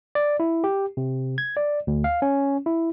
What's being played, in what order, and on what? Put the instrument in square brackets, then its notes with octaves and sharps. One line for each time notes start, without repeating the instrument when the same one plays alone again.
[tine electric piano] D5
E4
G4
C3
G#6
D5
D2
F5
C#4
E4